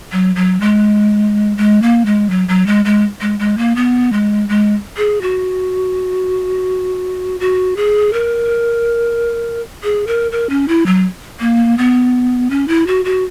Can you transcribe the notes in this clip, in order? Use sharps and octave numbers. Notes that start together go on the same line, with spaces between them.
F#3
F#3
G#3
G#3
A#3
G#3
F#3
F#3
G#3
G#3
G#3
G#3
A#3
B3
G#3
G#3
G#4
F#4
F#4
G#4
A#4
G#4
A#4
A#4
C#4
E4
F#3
A#3
B3
C#4
E4
F#4
F#4